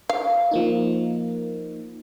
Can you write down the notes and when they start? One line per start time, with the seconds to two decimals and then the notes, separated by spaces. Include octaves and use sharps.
0.09 F5
0.51 F3 A#3 D#4